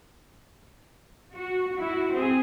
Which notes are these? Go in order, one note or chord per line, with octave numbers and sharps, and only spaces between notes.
F#4
E4 F#4
C4 G#4